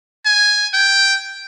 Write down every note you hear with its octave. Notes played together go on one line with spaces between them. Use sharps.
G#5
G5